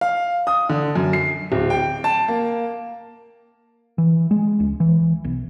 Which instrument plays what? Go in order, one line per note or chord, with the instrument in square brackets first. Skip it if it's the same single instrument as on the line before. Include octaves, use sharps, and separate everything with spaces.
[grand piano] F5
D#6
D3
F#2
C7
D1
G5
A5
A#3
[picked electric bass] E3
G#3
C#2
E3
B1